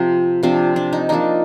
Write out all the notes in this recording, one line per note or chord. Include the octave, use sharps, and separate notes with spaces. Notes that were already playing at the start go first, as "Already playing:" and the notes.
Already playing: C3 F3 C4 F4
C3 F3 C4 D4
D4
D#4
F3 A#3 D4 D#4